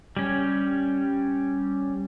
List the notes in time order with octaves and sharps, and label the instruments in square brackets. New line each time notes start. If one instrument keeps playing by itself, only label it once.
[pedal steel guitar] G3 C#4